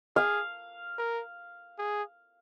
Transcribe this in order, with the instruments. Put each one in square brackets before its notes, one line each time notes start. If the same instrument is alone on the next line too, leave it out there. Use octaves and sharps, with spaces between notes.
[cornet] G#4 [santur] F5
[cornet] A#4
G#4